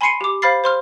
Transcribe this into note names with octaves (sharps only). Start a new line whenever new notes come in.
G#5 B5 C6 C7 C#7 D#7
G4 D6
C5 F5 B5 F6 A6 C7
C5 C6 F6